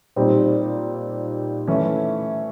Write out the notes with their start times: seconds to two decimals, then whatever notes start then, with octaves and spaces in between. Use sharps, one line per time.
0.16 A#2 G3 C4 D#4 G4
1.68 E3 A3 C#4